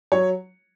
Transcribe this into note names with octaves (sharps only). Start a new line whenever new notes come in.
F#3 C#5